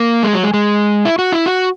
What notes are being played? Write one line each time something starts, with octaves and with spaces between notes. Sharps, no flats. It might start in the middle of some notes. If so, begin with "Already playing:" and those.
Already playing: A#3
G#3
F#3
G#3
G#3
E4
F#4
E4
F#4